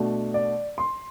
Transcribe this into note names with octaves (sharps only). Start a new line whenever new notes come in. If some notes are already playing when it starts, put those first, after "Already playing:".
Already playing: B2 A3 D4
D5
C6